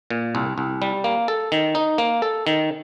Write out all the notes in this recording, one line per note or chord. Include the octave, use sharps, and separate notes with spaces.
A#2
C2
C2
G3
A#3
A4
D#3
D#4
A#3
A4
D#3